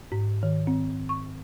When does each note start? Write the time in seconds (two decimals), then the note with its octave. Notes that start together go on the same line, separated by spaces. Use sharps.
0.12 G#2
0.43 D#3
0.67 C4
1.09 C#6